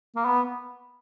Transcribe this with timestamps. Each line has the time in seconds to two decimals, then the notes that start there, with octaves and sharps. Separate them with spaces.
0.16 A#3
0.25 B3